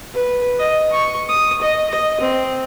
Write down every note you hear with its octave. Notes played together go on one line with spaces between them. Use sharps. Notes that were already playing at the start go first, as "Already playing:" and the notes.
B4
D#5
C#6
D#6
D#5
D#5
C4